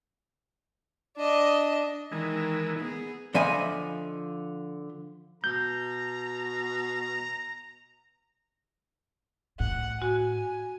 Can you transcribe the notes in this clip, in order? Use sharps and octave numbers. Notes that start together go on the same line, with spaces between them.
D4 D#5
D#3 E3 G#3
B3 G#4
D3 F3 D#5 E5 G#5 B5
B2 A#5 G6
A2 F#5
F#4 G#5